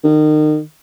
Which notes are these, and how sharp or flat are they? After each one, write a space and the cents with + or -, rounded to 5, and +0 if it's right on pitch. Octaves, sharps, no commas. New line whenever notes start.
D#3 -30